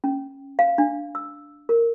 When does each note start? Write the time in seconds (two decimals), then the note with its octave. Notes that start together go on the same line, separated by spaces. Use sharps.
0.04 C#4
0.59 F5
0.78 D4
1.15 E6
1.69 A#4